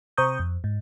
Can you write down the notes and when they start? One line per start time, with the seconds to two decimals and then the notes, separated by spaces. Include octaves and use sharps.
0.17 C3 C5 A#5 C#6 D#6 G6
0.39 F2
0.64 G#2